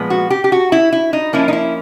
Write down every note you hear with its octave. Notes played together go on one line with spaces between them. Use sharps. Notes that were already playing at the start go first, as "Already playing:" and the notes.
Already playing: A#2 F3 G#3 B3
F#4
G4
G4
F#4
E4
E4
D#4
F3 A#3 C#4 E4
D#4
E4